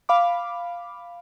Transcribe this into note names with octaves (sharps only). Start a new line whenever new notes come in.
F5 B5 D6